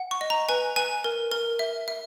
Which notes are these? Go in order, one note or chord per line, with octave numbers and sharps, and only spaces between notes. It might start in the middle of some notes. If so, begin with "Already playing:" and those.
Already playing: F#5
C#6
D#5
A#5
B4 G#5
B4 G#5
A#4
A#4
E5
E5